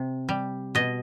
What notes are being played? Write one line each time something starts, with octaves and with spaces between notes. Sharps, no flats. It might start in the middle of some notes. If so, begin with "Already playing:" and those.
Already playing: C3
G3
B2 D#5